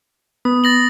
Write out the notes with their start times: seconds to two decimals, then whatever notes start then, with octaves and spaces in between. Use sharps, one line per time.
0.45 B3 D#6
0.64 A6 A#6 F#7